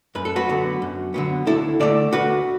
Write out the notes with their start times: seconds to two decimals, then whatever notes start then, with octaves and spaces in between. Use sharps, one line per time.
0.15 F#2 B4
0.25 A4
0.36 F#4 B4
0.49 D3 F#3 B3
0.82 F#2
1.14 D3 F#3 B3
1.46 D2 E4 A4
1.80 D3 A3 A4 D5
2.13 D2 F#4 B4